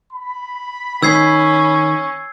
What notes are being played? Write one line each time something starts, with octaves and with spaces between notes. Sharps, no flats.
B5
D#3 C#4 E6 G#6 C7